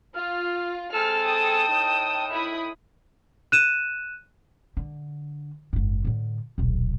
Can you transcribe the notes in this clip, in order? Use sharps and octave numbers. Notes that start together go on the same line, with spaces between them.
F4 F6
G#3 C4 A4 A5 F6 E7
G5 D#6
A2 D#4
E4 B5 D#6
F#6 D#7 E7
D3
F#1 G#2
A2 D3
D#1 B1